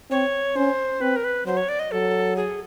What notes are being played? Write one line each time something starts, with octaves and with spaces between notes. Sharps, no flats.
C4 C#5
C#4 C5
C4 B4
A#4
B4
F#3 C5
C#5
D5
D#5
F#3 A4
G#4